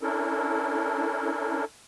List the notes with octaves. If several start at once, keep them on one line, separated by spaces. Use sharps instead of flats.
C#4 D4 E4 A4 A#4